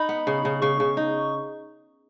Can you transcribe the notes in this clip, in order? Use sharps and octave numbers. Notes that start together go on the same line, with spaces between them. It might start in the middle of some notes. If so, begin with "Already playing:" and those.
Already playing: D#4 B5
B3
C#3
C#3
C#3 C#6
C#3
D#4